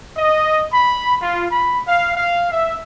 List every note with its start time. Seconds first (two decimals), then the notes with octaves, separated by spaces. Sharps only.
0.17 D#5
0.73 B5
1.21 F4
1.51 B5
1.88 F5
2.16 F5
2.52 E5